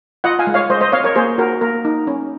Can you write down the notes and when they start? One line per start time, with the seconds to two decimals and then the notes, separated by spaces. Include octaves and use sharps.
0.24 F4 D#5 F#5
0.39 F5 G#5
0.47 G#3
0.54 C#5 F5
0.70 G#3 C5 D#5
0.81 C5 D#5
0.92 C4 C#5 F5
1.04 A#4 C#5
1.16 A#3 G#4 C5
1.38 F#4 A#4
1.61 A#3 A#4
1.85 D#4
2.07 C#4